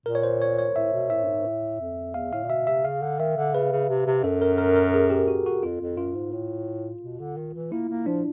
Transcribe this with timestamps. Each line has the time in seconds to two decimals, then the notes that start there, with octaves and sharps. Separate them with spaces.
0.06 A#2 A#4
0.15 C#5
0.23 C5
0.41 C#5
0.58 C#5
0.76 A2 E5
0.93 B2
1.10 A2 E5
1.23 G2
1.28 G#2
1.45 A2
1.80 F2
2.14 E2 F5
2.33 A2 F5
2.44 A#2
2.50 B2 E5
2.67 C3 E5
2.84 C#3 F5
3.02 D3
3.19 D#3 E5
3.37 D3
3.54 C#3 B4
3.72 C#3
3.89 C3
4.06 C3
4.23 F#2 A4
4.42 A#4
4.58 A#4
4.76 A#4
4.94 G#4
5.10 G4
5.28 F#4
5.46 F#4
5.63 F2 F4
5.80 F2
5.98 F#2 F4
6.15 G#2
6.32 A2
7.02 B2
7.20 D3
7.37 D#3
7.54 E3
7.72 A#3 E4
7.89 A#3
8.06 F3 D4